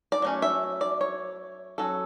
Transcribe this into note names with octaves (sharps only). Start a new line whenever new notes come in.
D5
F#3 A3 C#4
E5
D5
C#5
F#3 C#4 A4